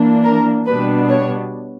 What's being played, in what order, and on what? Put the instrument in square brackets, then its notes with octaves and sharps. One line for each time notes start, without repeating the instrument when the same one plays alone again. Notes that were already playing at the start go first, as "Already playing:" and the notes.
Already playing: [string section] E3 A#3 D4
A#4
B2 G3 B3 D4 B4
C#5